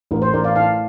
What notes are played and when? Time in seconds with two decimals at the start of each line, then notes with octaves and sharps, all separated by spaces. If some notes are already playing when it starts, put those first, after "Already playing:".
0.11 A1 A#4
0.22 C5
0.33 A1 A#4 D5
0.44 D5 F5
0.56 A2 F5 A5